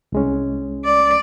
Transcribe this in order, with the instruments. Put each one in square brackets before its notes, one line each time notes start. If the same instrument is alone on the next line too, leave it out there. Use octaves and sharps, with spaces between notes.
[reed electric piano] C2 G#3 C#4
[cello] D5